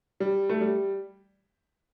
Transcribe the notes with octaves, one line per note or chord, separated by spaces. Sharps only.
G3
A3
G3